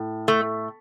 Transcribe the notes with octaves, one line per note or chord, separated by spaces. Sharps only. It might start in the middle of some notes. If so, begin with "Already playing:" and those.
Already playing: A2
A3